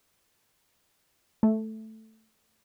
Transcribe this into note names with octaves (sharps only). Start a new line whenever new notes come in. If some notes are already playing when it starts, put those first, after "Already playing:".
A3